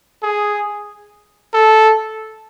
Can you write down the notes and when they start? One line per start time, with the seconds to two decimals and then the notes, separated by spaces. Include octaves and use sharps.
0.23 G#4
1.54 A4